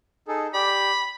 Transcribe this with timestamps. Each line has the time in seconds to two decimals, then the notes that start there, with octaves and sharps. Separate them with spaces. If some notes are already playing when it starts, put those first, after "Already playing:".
0.28 D#4 G#4 A4
0.54 G4 D5 B5